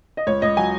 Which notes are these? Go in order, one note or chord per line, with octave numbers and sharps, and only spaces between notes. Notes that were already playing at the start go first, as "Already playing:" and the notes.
D#5
C#2 C#5
C#2 D#5
F#3 G#5